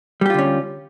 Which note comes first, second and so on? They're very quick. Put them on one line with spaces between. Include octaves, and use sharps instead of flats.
G3 G4 F4 D3 C#4